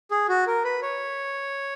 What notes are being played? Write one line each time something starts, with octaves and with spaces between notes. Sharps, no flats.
G#4
F#4
A#4
B4
C#5